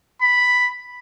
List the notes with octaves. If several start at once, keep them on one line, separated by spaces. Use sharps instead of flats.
B5